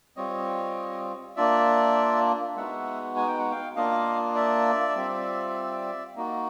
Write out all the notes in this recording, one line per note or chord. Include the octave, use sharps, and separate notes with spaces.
G3 C4 F4 C#5 D#5
A#3 D4 F4 D5 E5
G#3 B3 D#4 F#4 E5 F#5
G#5
G5
F#5
F5 G5
A#3 D4 F4 D#5 F5
D5 E5
G3 C4 F4
A#3 D#4 F#4